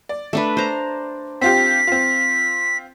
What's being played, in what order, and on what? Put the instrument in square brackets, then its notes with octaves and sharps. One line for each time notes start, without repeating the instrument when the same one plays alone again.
[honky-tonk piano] D5
[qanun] A3 D4 B4
C5 A#5
[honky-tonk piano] C4 F4 G4 [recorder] B6
[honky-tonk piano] C4 F4